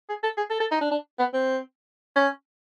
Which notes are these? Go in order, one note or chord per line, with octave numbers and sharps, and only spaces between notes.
G#4
A4
G#4
A4
A4
D#4
D4
D4
B3
C4
C#4